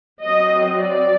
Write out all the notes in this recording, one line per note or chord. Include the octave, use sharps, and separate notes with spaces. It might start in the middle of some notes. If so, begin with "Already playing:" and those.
F#3 C4 D#5
D5